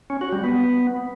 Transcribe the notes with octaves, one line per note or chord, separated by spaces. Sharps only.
C#4
F#4
G3
B3